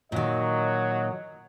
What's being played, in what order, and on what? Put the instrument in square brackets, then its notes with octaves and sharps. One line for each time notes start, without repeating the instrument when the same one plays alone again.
[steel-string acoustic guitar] A#2 D#3 [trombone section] F#3 [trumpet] D#5